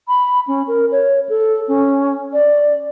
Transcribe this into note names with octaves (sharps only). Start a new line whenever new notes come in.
B5
C#4
A#4
C#5
A4
C#4
D5